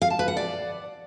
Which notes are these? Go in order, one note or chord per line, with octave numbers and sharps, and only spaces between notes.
F5
A5
B4
F#5
D5